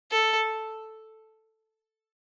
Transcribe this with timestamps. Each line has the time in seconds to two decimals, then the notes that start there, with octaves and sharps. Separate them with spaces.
0.11 A4